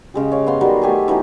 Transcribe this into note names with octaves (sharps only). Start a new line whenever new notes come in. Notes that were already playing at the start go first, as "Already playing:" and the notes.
C#3 G#3 G4
C#5 F5
B3 F5 C6
D#3 F#3 G3
A3 G4 G#5 C6
E3 F#3 B3 D#4